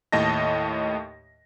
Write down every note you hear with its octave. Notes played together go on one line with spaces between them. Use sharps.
D#2 A2 D#5 A5 A#6